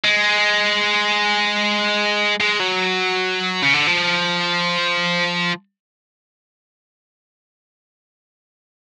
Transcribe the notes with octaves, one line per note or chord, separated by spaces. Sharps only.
G#3
G#3
F#3
C#3
D3
F3